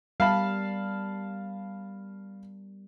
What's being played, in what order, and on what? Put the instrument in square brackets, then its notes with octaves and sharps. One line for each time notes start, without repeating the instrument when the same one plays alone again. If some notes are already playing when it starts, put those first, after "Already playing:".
[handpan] G3 B3 A#4 [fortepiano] F5 A5 B5